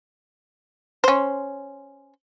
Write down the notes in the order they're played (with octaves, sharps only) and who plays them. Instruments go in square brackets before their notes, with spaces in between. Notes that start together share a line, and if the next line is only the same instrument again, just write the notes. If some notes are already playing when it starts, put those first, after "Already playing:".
[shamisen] C#4 C5